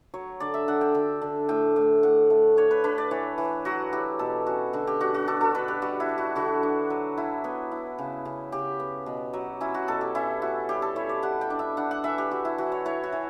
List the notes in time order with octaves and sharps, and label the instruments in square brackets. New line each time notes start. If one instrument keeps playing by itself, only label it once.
[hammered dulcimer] F#3 C#5
D3 D5
E5
D3 F#5
G5
D3
D3
A2 G5
A2
A2 F#5
A3
D4 C#5
B4
D4 B4
D5
E3 C#5
E3
F#3 F#4
E4 G4
B2 A4
C#4 F#4
D3 F#4
G4
D4 F#4
F#4
D4 A4
A4
D4 B4
G4
G3 F#4
E4
G3
F#4
D3 F#4
D4
F#3
E4
B3
E4
C#3
C#3
C#3 G4
B3
B2
F#3
C#4 E4
F#4
B2 A4
G4
C#4 E4
E4 F#4
G3 G4
A4
E4 C#5
D5
G3 F#5
G5
D4
E5
D4 F#5
F#5
E3 E5
G4
E4 F#4
E4
E3 F#4
C#5
E4 C#5
F#4
E3